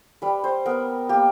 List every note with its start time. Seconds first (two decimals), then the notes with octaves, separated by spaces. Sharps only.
0.22 G3 B4
0.44 C5
0.66 B3 A#4
1.09 A#3 G4